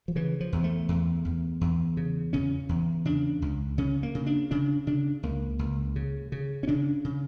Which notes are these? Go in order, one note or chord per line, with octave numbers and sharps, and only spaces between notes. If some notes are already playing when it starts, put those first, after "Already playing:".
F3
C#3 E3
F3
E2
A3
E2
E2
E2
C#3
C#3 C#4
E2
C#3 D4
C#2
C#3 C#4
A#3
C#3
D4
C#3 D4
C#3 D4
C#2 A#3
C#2
C#3
C#3
C#4
C#3 D4
C#3